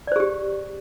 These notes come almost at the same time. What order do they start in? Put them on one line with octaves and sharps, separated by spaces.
D5 C5 G#4 G4